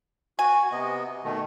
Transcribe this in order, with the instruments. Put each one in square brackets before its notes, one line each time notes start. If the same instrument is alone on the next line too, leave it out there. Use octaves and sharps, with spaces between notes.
[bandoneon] F#4 [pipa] G#5
[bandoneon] C3 B3 D#5
B2 D#3 A3